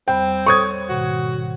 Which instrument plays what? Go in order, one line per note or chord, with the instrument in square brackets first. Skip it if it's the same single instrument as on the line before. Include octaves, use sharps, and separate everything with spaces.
[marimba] E2 G3 B5 [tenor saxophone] C4 [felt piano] G5
[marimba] A4 C5 C#5 [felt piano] C#6 D#6 G#6
[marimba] G#2 B2 D#3 [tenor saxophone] F#4